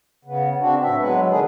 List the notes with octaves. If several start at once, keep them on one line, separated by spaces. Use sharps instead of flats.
C#3 B3
C4 D4 F#4
A2 F#3 E5
F#3 G#3 B3 B4
D3 D#3 D4 G#4